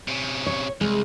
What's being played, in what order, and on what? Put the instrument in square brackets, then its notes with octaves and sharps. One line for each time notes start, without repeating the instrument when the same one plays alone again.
[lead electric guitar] C3 C#4
[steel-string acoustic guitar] C#5
[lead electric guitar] C2 [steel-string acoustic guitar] G#3